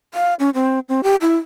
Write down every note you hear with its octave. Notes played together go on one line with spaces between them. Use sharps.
F5
C#4
C4
C4
G4
E4